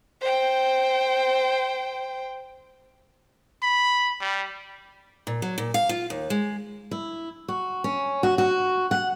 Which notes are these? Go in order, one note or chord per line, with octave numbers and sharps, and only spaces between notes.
C5 G5
B5
G3
A#2
F#3
A#2
F5
F4
D#2
G#3
E4
F#4
C#4
F#4
F#4
F#5